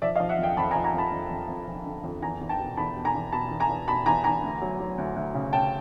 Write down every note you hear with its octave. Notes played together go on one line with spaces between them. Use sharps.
F3 D5 E5
D#5 F5
F3
E5 F#5
F2 F5 G5
F2 A5 B5
G#5 A#5
F3
G#5 A#5
F2 A5 B5
F2
F2
F2
F3
D3
F2
E2 G#5 A#5
E2
G5 A5
B2
E2 A5 B5
B2
G#5 A#5
E2
B2 A5 B5
E2
G#5 A#5
E2
B2 A5 B5
E2 G#5 A#5
E2 G#5 A#5
D2
F#3
F#3
D2
D2
C#3
C#3 G5 A5